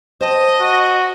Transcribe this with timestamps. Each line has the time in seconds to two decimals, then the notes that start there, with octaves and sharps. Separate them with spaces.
0.21 C5 D#5 G5 A5
0.61 F#4